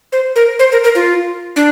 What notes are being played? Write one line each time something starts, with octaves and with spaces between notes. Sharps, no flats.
C5
A#4
C5
A#4
A#4
F4
D4